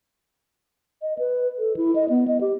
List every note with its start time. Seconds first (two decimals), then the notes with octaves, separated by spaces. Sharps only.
1.02 D#5
1.19 B4
1.59 A4
1.76 E4
1.95 D#5
2.09 B3
2.28 D#5
2.41 G4